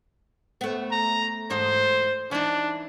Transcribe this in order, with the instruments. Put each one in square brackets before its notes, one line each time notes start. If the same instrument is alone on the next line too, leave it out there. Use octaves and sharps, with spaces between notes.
[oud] A3 B3
[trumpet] A#5
[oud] E2 G#2 A4 [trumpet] C5
[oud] E3 D#4 [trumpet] D4